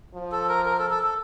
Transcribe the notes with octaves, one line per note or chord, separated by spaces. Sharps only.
F3
A4
A#4
A#4
A4
A4
A4